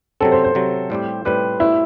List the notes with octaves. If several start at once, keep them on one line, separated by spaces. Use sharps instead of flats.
C3 F#3 C4 A4
C5
C5
C3 F#3 C4
A2 G3 C4 G4
A2 G3 C4 G4 B4
A2 G3 B3 E4 F#4 C5